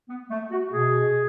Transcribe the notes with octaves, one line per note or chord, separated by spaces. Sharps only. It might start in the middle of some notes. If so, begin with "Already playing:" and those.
B3
A3
F#4
B2 G#4